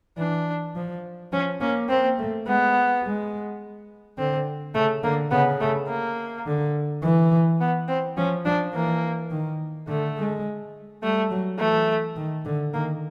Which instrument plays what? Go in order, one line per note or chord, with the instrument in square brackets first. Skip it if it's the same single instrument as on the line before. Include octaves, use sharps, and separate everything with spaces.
[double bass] E3 [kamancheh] D4
[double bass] F3
[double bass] F3 [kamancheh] C#4
[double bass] A#3 [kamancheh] C#4
[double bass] A#3 [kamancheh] C4
[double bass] A3
[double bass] G#3 [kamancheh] B3
[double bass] G#3
[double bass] D3 [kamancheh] C4
[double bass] C#3 [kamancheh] A3
[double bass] D3 [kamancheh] A#3
[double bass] C#3 [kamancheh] B3
[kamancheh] A3
A#3
[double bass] D3
E3
[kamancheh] B3
C4
[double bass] F3 [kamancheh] C#4
[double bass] F3 [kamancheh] D4
[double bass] E3 [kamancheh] A#3
[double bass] D#3
[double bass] D3 [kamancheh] A3
[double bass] G#3
[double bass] G3 [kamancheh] A3
[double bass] F#3
[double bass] E3 [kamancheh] A3
[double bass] D#3
D3
[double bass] D#3 [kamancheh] A#3